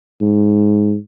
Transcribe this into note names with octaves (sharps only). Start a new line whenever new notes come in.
G#2